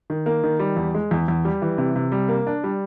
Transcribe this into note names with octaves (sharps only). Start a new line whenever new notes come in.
D#3
A#3
D#3
G3
E2
G#3
E2
E2
G3
E3
C3
C3
G3
A#3
D4
G3